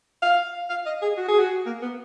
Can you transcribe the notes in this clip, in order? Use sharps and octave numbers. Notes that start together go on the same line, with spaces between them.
F5
F5
D#5
G#4
F#4
G#4
F#4
A#3
B3